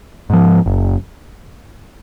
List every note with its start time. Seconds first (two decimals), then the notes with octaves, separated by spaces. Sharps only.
0.30 G#2 F3
0.66 F#1